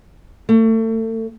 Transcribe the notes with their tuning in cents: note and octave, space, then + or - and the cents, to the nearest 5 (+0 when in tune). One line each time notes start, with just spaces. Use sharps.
A3 +30